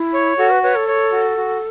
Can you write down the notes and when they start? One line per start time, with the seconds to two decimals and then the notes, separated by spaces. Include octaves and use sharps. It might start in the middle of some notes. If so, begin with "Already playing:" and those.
Already playing: E4
0.14 C#5
0.38 F#4 A4
0.50 B4
0.63 B4 C#5
0.76 A4
0.88 C#5
1.12 F#4
1.37 F#4